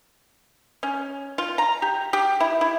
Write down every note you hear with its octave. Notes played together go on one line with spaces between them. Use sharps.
C#4
F4
A#5
G4
G4
E4
E4